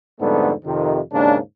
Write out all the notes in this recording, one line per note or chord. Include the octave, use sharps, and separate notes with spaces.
F2 G#2 D3 G3 A3 B3
F2 C3 D#3
D#2 G#2 C#3 A#3 D4